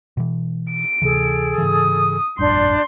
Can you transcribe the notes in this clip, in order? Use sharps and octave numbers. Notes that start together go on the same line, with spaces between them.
B2 E3
D7
D2 C3 E3 G#4 A4
G#2 C#3 E3 D#6
F1 A#1 G2 D4 D5 C6 G6